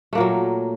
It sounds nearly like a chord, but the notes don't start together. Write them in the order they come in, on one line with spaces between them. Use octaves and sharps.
A3 A#3 A#2 F#3